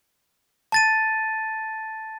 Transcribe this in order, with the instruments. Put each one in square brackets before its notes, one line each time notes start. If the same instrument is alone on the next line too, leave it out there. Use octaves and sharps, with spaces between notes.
[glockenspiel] A5 A6 D#7